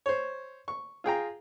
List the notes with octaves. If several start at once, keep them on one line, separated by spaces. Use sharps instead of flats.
C5 C#5
C#6
F4 G#4 G5 A#5